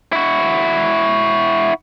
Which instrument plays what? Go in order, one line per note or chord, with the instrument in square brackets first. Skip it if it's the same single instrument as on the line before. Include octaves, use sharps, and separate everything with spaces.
[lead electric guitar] E4 F#4